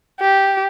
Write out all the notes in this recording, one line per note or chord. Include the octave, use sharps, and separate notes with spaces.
G4